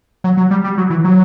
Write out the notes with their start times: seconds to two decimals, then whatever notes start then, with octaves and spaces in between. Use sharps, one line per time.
0.24 F#3
0.37 F#3
0.51 G3
0.64 G3
0.78 F#3
0.90 E3
1.04 F#3